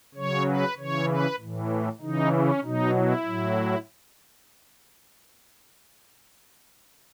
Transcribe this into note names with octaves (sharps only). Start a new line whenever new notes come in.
C#3 F#3 C#5
B4
C#3 E3 C#5
B4
A2 E3
C#3 E3 D#4
C#4
B2 F#3 D#4
E4
A2 F#3